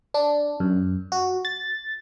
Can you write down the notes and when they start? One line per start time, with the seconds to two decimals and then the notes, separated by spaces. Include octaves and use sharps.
0.14 D4
0.60 F#2
1.12 F#4
1.45 A6